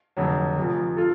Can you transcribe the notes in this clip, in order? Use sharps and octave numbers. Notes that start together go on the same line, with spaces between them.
F1 F2 D3 F#3
F1 F2 F3
F4 A4